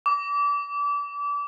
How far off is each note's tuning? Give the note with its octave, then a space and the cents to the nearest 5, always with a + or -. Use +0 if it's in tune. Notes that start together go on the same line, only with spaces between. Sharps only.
D6 -30